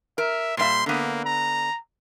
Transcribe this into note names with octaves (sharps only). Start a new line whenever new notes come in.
A#4 E5
A#2 G3 E5 C6
D3 A#3 B3
A#5